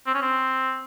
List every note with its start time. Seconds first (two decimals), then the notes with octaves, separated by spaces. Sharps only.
0.07 C4
0.15 C#4
0.22 C4